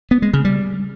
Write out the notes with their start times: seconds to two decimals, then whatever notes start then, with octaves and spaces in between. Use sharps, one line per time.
0.11 B3
0.22 G#3
0.33 C#3
0.45 G3